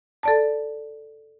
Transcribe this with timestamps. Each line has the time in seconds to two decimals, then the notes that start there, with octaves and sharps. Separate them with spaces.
0.23 A4 D5 A5